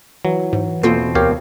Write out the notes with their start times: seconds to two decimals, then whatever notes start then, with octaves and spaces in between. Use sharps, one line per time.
0.25 E3 F#3
0.53 G#2
0.83 E2 B2 A#3 C4 F4 A4
1.15 D2 G4 A#4 C#5 F5